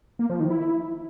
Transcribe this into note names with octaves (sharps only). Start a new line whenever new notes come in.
A#3
F3
D#3
E4